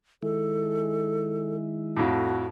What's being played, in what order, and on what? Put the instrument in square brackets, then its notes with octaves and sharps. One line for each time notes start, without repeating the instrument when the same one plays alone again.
[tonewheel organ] D#3 G#3 E4 [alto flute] A4
[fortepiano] F2 A2 [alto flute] F#4